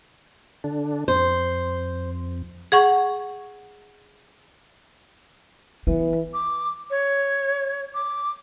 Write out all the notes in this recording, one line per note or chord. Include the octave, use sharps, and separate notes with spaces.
D3 D4
F2 C5
G#4 F#5 C#6
E3 B3
D6
C#5
D6